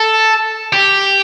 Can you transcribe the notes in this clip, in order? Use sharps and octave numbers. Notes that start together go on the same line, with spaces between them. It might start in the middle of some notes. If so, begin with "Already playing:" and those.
Already playing: A4
G4